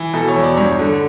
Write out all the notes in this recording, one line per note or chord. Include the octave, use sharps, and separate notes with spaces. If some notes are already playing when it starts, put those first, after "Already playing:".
Already playing: E3
B2 A4
C#5
E2
D5
G2 C#5
D3